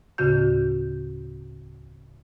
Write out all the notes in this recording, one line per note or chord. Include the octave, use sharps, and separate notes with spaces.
D2 A2 C#3 F#4 G6